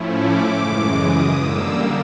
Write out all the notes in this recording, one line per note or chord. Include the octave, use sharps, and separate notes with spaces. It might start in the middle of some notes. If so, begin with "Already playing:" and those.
Already playing: A2 F3 A3 C#4 E4
D6
F#2 C#3 E3 G#3
D#6
D3 G3 A#3 E6